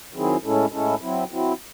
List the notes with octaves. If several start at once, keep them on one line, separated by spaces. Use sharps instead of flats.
D#3 F#3 C4 E4 G#4
A2 G#3 C#4 E4 A4
A2 G#3 C#4 E4 A4
F#3 C4 E4
F#3 C4 E4